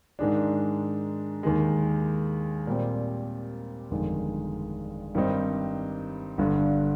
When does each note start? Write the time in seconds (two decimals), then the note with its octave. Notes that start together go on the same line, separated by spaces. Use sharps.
0.19 G#2 D#3 G#3 D4
1.43 D#2 D#3 G#3
2.67 A#2 G3 C4
3.91 G1 F2 D#3 G#3
5.15 G2 D#3 G3 C4 D#4
6.38 G1 G2 D3